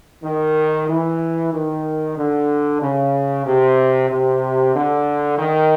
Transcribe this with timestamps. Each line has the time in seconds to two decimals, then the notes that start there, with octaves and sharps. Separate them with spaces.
0.24 D#3
0.88 E3
1.53 D#3
2.17 D3
2.82 C#3
3.46 C3
4.10 C3
4.75 D3
5.38 D#3